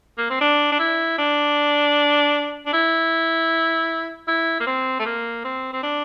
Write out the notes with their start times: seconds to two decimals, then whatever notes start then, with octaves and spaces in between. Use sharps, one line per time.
0.18 A#3
0.30 C4
0.41 D4
0.72 D4
0.80 E4
1.18 D4
2.66 D4
2.73 E4
4.28 E4
4.60 A#3
4.67 C4
5.00 A3
5.06 A#3
5.45 C4
5.73 C4
5.83 D4